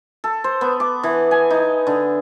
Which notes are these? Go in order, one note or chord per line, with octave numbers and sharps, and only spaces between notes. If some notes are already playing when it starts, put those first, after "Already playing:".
A4
C5
B3
D6
E3
G#5
D#4
D3